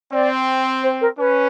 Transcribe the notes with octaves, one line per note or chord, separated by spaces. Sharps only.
C4 D5
C5
A#4
C#4 B4